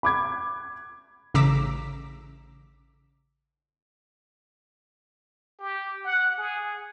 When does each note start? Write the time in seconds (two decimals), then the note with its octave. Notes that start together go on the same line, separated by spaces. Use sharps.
0.03 B5 D6 G#6
1.34 A1 C#3 A#5 D6 E6 B6
5.59 G4
6.04 F#5
6.38 G#4